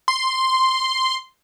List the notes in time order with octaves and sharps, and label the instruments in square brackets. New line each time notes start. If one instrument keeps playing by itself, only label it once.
[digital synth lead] C6